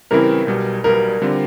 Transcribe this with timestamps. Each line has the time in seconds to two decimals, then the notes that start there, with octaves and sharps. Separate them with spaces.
0.11 C#3 E3 G3 C4 E4 A#4
0.47 B1 B2 G3
0.84 B1 B2 G3 A#4
1.22 D3 G3 C4 F4